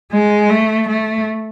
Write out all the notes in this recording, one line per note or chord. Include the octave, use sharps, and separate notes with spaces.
G#3
A3
A3